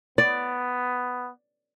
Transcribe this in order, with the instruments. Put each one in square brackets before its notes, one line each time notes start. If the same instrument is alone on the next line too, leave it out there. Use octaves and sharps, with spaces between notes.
[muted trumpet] B3 [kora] D5